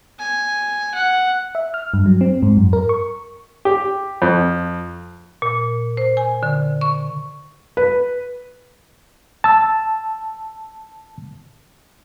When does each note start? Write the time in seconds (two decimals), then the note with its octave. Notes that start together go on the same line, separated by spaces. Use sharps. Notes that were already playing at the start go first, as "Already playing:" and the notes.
0.19 G#5
0.94 F#5
1.55 E5
1.74 F6
1.94 G2
2.06 F#3
2.21 C4
2.42 G#2
2.57 F#2
2.73 A#4
2.89 C#6
3.65 G4
4.22 F2
5.42 A#2
5.97 C5
6.17 G#5
6.43 D3
6.81 C#6
7.77 B4
9.44 A5 E6